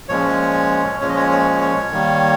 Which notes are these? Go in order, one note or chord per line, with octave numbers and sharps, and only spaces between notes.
A#2 F3 G#3 C#4 C#5
A#2 F3 G#3 C#4 C#5
D#5
C#5
C#5
C#5
D#3 G3 A#3